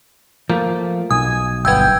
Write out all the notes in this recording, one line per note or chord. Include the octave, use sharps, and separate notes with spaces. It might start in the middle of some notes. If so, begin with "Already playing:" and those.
F3 A3 A#3
B1 G#5 D#6
G1 B3 G5 E6 G6 G#6